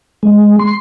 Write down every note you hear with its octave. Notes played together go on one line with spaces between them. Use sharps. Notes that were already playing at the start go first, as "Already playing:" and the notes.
G#3
C6